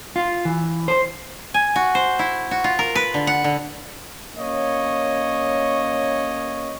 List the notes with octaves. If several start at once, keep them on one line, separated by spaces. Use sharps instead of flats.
F4
E3
C5
G#5
F#4
C5
E4
F#4
F4
A#4
B4
D3
F#5
D3
A#3 C#4 C#5 D#5